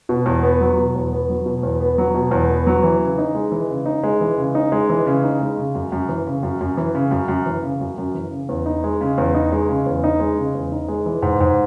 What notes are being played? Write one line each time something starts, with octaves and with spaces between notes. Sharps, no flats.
B2
E2
B3
F#3
B2
E2
B3
F#3
B2
E2
B3
F#3
B2
E2
B3
F#3
E3
C#3
D#4
G#3
E3
C#3
D#4
G#3
E3
C#3
D#4
G#3
E3
C#3
D#4
G#3
C#3
F#2
F#2
E3
C#3
F#2
F#2
E3
C#3
F#2
F#2
E3
C#3
F#2
F#2
E3
C#3
E2
D#4
G#3
C#3
E2
D#4
G#3
C#3
E2
D#4
G#3
C#3
E2
D#4
G#3
E3
G#2
G#2